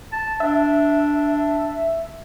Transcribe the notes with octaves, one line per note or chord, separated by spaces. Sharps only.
A5
D4 E5